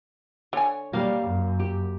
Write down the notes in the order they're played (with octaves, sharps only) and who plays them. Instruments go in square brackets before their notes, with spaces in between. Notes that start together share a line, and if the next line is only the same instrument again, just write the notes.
[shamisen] D3 G#5 [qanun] C#5
[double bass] G3 [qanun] A#3 F5
[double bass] F#2
[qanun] G4